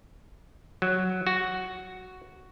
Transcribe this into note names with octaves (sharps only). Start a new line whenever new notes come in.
F#3
F#4